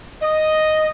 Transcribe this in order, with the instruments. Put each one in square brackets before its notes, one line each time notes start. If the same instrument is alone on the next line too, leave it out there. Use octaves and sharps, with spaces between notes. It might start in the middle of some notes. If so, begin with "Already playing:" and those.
[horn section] D#5